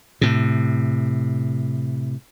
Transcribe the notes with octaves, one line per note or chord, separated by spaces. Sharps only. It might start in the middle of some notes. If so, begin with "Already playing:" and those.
A2 C3